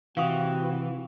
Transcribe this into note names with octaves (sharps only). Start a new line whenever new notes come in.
C3 E3 C4 F#4 F5 C#6 D#6